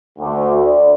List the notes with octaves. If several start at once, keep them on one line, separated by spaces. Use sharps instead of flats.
D2
D5